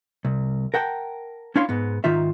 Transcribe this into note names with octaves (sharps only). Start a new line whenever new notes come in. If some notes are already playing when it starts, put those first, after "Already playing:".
C2
A#4 F#5 G5 A5
C#4 D4 E4 C#5 F5 C6
G#2 B3
G#2 D#3 D#4 F4 E5